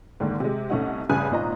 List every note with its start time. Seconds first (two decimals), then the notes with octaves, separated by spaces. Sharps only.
0.20 G#2 D3 D#3 A#3
0.40 C3 G#3
0.70 C2 A3 C#4 D#4 F#5
1.09 A1 G2 C#3 G#5 D#6 F#6
1.30 G#1 A#2 D#5 A#5